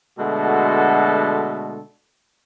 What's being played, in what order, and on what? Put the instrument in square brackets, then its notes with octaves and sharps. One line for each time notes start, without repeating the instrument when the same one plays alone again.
[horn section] B2 D3 G#3 A3 F#4 A4